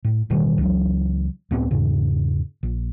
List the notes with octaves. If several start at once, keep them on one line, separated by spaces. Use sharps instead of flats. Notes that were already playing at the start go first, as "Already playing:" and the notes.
A2
A1 B2 D#3 G3
C#2 E3 F#3
C#2 A2 B3 C4
E2 G#2 C#3
A#1